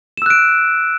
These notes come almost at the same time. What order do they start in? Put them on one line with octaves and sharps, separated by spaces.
E7 E6 F#6 D7